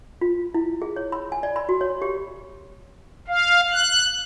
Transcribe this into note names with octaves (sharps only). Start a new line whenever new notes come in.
F4
E4
G#4
C#5
B5
G#5
D5
B5
F#4
C#5
G4
F5
F#6